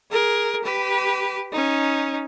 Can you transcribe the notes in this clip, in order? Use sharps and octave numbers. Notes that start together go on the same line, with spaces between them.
G#4 A#4
G4 B4
C#4 D#4